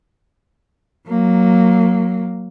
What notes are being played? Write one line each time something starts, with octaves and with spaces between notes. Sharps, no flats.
F#3 A#3